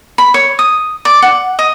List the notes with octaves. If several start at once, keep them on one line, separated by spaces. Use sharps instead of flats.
B5
C#5
D#6
D5
F#5
D#5